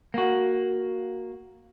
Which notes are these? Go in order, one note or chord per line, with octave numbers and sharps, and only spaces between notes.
A#3 F#4